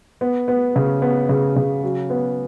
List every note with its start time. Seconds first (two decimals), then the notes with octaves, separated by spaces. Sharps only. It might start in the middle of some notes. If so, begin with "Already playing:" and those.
0.21 B3
0.48 B3
0.76 C#3
1.02 B3
1.29 C#3
1.56 C#3
1.83 F#3
2.10 B3